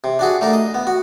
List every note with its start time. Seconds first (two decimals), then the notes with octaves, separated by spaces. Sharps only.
0.04 C3
0.19 D4 F#4 G#4
0.41 A3 D4 A#4
0.53 D#5
0.74 B3
0.87 F#4